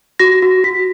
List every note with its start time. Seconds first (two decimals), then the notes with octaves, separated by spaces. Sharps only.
0.20 F#4 A#6
0.42 F#4
0.64 F#4 B6